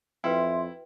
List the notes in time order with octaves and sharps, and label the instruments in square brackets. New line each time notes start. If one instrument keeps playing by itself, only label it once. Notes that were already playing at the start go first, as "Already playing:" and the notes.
[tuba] F2 [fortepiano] E4 [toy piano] F#4 B4 G5 [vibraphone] E5 C6